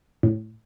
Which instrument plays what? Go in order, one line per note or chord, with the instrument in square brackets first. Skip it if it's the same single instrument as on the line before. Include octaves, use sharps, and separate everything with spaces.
[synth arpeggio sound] A2